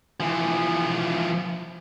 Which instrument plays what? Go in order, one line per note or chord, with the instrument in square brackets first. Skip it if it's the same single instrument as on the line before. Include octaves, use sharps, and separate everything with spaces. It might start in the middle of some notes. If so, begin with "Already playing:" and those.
[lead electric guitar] E3 F3